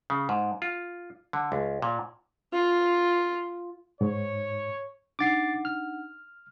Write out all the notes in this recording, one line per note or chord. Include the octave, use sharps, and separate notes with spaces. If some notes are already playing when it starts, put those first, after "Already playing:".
C#3
G#2
F4
D3
C#2
A#2
F4
G#2 C#5
D4 D#4 F#5 D6 A6 C7
F6